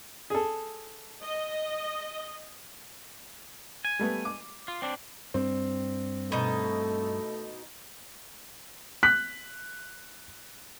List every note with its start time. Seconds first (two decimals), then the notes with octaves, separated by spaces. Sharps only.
0.30 G#4 A4
1.22 D#5
3.85 G#5
3.99 G3 A3 B3
4.25 D6
4.68 F4
4.82 C4 D4
5.34 G2 G3 C4
6.32 B2 A3 D#4
9.03 F#6 B6